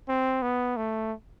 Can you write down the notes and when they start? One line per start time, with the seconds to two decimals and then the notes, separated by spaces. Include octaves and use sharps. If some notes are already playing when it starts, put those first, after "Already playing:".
0.08 C4
0.42 B3
0.77 A3